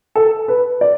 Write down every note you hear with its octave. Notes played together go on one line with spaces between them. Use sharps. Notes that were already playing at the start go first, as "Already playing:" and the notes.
A4
B4
D5